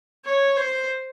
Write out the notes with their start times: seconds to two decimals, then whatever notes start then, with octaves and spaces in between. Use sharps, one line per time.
0.25 C#5
0.57 C5